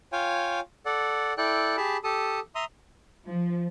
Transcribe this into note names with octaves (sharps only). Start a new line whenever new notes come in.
F4 C#5 F5 G5 G#5
A4 D5 F#5
E4 A4 D5 G5 F#6
G4 G#4 A5 B5
G4 A4 A5 D#6
E5 A#5 C6 D#6
F3